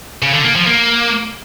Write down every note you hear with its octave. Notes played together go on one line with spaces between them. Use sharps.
C#3
D3
A#3
F3
A#3